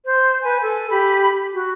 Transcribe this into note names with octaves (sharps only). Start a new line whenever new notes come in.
C5
B4 G#5
A4 G#5
G4 B5
F#4